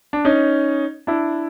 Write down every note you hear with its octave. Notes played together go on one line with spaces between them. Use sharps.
D4
C#4 D#4
D4 E4